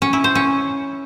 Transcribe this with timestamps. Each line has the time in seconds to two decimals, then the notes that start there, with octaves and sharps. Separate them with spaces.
0.02 C#4
0.13 E4
0.24 C5
0.35 C#4